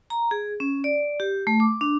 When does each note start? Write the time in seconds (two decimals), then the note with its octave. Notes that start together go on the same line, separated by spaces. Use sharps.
0.10 A#5
0.31 G#4
0.60 C#4
0.84 D5
1.20 G4
1.47 A3
1.60 D6
1.81 D4